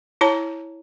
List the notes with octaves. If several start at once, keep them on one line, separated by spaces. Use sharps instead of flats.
E4 C#5 A5 A#5